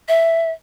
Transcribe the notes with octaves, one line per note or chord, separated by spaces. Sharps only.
E5